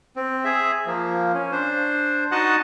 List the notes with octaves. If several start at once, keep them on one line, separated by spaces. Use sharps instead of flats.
C4
G#4 E5
F3 A#3
C#4
D4 C5
D#4 F#4 D#5 F#5 A5